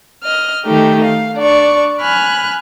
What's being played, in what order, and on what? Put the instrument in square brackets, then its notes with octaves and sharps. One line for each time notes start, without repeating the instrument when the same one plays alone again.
[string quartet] D#5 F6
D#3 A3 D#4 G4
F5
D4 D5 C#6
G#5 B5 F6 F#6